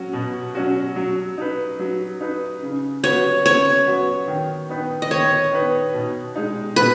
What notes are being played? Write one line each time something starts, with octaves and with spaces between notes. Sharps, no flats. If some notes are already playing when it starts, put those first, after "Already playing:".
Already playing: F#3 C#4 F#4
B2
F#3 C#4 F#4
F#3
D#4 B4
F#3
D#4 B4
C#3
F#3 B3 F#4 B4 C#5
C#3 C#5
F#3 B3 F#4 B4
D#3
B3 D#4 B4
D#5
D#3 C#5
B3 D#4 B4
B2
G#3 D#4
B2 B4